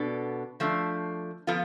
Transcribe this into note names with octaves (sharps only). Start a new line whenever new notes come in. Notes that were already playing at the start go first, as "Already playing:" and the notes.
Already playing: B2 B3 D4 A4
F3 A3 D4
F3 B3 F4 A4